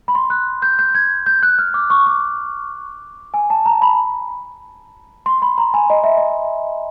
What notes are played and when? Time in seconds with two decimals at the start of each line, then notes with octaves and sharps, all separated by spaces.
0.08 B5
0.15 C6
0.30 F#6
0.62 G6
0.79 G6
0.95 G#6
1.26 G6
1.43 F#6
1.59 F6
1.74 D6
1.90 C#6
2.06 D6
3.34 G#5
3.50 A5
3.66 A#5
3.82 B5
5.26 C6
5.42 B5
5.58 A#5
5.74 G#5
5.90 D#5
6.04 E5
6.17 D#5